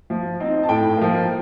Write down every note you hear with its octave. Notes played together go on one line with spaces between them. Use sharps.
F3
C4 D#4
A5
A2 G5
F3 A#3